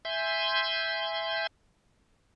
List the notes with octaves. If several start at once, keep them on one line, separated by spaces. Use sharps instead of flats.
E5 G#5 C6 G6